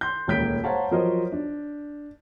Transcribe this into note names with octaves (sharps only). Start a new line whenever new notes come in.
C6 G6
D#1 C#2 A#3 G6 B6 D7
C5 C#5 F5 F#5 A5 A#5
F3 F#3 A#4 C5 C#5 D#5
D4